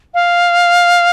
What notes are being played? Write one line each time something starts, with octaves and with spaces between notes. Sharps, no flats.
F5